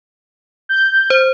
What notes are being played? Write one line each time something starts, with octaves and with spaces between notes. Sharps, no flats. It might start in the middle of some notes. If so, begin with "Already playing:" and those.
G6
C5